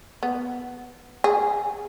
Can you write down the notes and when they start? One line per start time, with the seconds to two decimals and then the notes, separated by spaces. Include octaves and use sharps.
0.23 B3
1.24 G#4